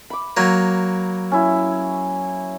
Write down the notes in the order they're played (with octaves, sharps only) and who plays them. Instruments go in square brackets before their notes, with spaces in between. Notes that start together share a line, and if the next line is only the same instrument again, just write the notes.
[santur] B5 D6
[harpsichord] F#3 A#3
[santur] C#4 E4